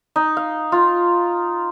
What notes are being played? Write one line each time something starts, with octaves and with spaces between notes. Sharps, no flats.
D#4
F5
F4